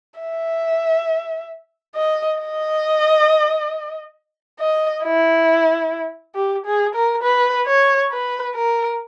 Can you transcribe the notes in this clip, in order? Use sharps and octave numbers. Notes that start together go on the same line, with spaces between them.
E5
D#5
D#5
D#5
E4
G4
G#4
A#4
B4
C#5
B4
A#4